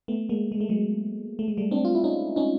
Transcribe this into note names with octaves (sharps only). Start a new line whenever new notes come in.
A3 B3
G#3 A#3
G#3
A3
F#3 G#3
A3
G#3
G3 A3
C4 D4
F4
E4
C#4 D#4
C#4 D#4